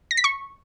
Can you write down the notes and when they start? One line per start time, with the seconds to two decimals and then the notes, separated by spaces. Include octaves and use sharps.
0.11 A#6
0.17 B6
0.24 C#6